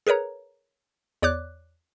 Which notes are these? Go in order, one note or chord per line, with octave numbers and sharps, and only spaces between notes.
G#4 A#4 B4 C#5 A#5
E2 C#5 D5 D6 F#6